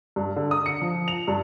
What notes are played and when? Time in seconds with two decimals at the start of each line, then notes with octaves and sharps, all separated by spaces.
0.16 G2
0.36 D3
0.51 D#6
0.66 C#7
0.81 F3
1.08 F7
1.28 G2